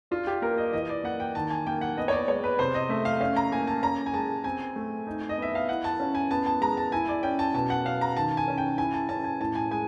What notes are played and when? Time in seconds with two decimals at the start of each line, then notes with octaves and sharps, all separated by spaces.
0.11 D4 F4
0.27 G4
0.42 A#3 A#4
0.58 D#5
0.73 E3 D#5
0.89 D5
1.04 A#3 F#5
1.20 G5
1.35 D#3 A5
1.50 G#5
1.67 A#3 G5
1.81 F#5
1.97 B3 D#5
2.08 C#5
2.12 D5
2.28 G#3 C#5
2.44 B4
2.59 C3 C5
2.74 D#5
2.89 A3 E5
3.05 F5
3.20 C#4 F5
3.36 A#5
3.52 A#3 G#5
3.67 A5
3.83 C#4 A#5
4.06 G#5
4.14 G#3 A5
4.44 C4 G#5
4.76 A3
5.07 D#4
5.29 D#5
5.38 B3 E5
5.55 F5
5.69 E4 F#5
5.84 A5
6.00 C#4
6.15 G#5
6.31 B3 A5
6.46 A5
6.61 G#3 A#5
6.77 A5
6.92 E4 G#5
7.08 D5
7.23 C#4 G5
7.39 A5
7.54 B2 A5
7.70 F#5
7.85 C#4 F5
8.01 A#5
8.16 D#3 A5
8.37 G#5
8.48 C#4
8.58 G5
8.78 E4 G#5
8.94 A5
9.09 C#4 A5
9.24 G#5
9.40 A2 A5
9.55 G#5
9.71 G#3 G#5